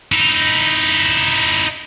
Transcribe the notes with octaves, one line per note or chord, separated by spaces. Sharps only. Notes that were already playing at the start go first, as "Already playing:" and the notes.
D#4 E4